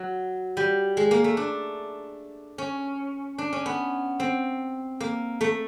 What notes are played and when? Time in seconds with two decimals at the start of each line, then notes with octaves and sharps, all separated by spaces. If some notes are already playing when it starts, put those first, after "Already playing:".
Already playing: F#3
0.57 G3
0.97 G#3
1.11 A#3
1.24 A3
1.37 D4
2.58 C#4
3.38 D4
3.53 C#4
3.66 B3
4.20 C4
5.00 A#3
5.41 A3